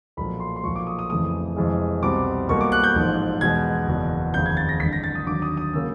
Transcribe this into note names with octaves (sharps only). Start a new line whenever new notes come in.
B1 A#2 F3 B5
C6
C6
B1 A#2 F3 C#6
D6
D#6
D#6
F2 C#3 E3 A3 D#6
F2 C3 E3 G#3
C2 B2 G3 C4 D6
B1 B2 G3 A#3 C#6
D6
F#6
G6
A1 G#2 F3
E2 B2 G#3 G#6
F#1 E2 B2
F1 D#2 C#3 F3 G6
G#6
A6
A#6
A1 G2 D3 B6
A#6
A6
D#6
D#2 D3 F#3 D6
D#6
D#6
C#3 F#3 A#3 C#4 E6